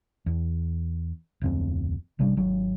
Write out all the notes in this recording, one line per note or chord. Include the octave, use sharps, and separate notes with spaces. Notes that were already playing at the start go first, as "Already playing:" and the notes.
E2
D1 F2 C4
G#1 C3 G3 D4
G#1 F#3